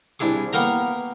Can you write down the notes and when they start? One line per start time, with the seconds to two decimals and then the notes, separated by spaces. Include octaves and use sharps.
0.20 C2 D4 E4 G#4 D6
0.53 A#3 B3 A#4 G5 A#5